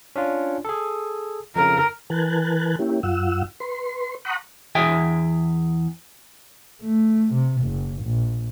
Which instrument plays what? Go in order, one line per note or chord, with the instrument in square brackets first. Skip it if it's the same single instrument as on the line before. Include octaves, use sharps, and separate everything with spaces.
[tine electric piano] C#4 D4 F4
G#4 A4
[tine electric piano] F2 C#3 [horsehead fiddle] A#4
[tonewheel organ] E3 A#4 B4 G#5 A5 F#6
A#3 C#4 E4 G4
F#2 F4 F#5 E6
B4 C6
F#5 A#5 B5 C#6 D#6 F#6
[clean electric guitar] E2 G#4 E5 G5 G#5
[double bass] A3
C3
F#1
A#1